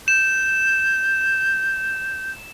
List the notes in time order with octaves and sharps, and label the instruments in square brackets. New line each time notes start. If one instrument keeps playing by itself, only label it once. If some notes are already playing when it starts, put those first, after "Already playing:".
[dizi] G6 [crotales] E7